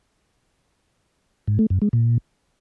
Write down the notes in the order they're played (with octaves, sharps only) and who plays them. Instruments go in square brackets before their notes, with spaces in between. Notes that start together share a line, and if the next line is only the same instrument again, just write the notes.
[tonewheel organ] G#2
A3
F#2
G#3
A#2